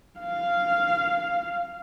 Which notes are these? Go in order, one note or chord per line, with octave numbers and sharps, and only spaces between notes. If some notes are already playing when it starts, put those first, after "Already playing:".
F5